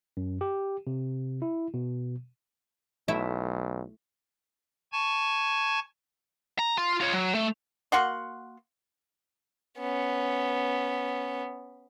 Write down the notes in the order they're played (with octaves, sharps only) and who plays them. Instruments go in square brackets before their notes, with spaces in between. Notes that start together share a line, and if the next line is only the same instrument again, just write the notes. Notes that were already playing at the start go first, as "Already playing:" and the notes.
[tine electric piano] F#2
G4
C3
E4
B2
[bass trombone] B1 [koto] A3 E4 E5
[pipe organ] G#5 A5 C#6 G#6
[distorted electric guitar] A#5
F4
F4 C#5
F#3
A3
[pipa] A#3 F#4 F#5 C6
[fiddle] B3 C#4